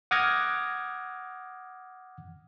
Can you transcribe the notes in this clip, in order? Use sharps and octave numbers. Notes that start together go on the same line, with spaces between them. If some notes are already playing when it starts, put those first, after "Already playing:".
F#5 D6 D#6 F6 G#6 A#6